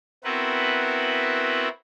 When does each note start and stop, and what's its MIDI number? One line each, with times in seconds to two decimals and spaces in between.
0.24 1.68 59
0.24 1.68 60
0.24 1.68 64
0.24 1.68 66
0.24 1.68 70
0.24 1.68 71